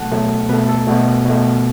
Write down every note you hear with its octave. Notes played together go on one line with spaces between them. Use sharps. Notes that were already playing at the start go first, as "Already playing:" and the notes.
Already playing: B2 F#3 A3 F#5 A5
B2 F#3 A3
B2 A3 B4
A4
B2 A3 F#4
B2 A3